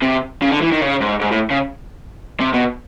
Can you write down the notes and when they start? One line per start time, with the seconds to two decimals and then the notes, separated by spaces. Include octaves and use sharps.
0.03 C3
0.42 C#3
0.51 D3
0.61 E3
0.72 D#3
0.81 C#3
1.01 G#2
1.21 G#2
1.31 A2
1.50 C#3
2.40 C3
2.54 B2